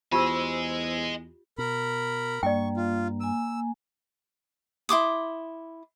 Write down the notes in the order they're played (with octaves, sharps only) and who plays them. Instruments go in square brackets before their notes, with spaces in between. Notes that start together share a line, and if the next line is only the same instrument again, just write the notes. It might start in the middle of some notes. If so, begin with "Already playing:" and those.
[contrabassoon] E2 [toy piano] F4 G4 [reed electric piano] C5 E6 [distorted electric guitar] D#5 G#5
[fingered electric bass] B2 [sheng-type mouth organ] A#4 B5
[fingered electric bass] G2 [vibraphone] A#3 [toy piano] D5 G5 [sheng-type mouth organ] C#6
[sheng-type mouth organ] F4
[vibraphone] A#3 G#5 [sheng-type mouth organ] E6
[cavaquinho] E4 C6 D6 D#6